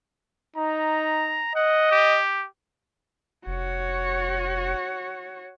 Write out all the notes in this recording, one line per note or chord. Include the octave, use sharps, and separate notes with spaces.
D#4 A#5
D#5 F#5
G4
F1 F#4 C#5